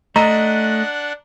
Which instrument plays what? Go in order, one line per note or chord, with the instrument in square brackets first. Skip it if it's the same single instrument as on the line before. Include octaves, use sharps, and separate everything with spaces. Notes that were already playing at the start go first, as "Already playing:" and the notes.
[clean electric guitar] A3 [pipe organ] D4 F#5 [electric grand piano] D#5 [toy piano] A#5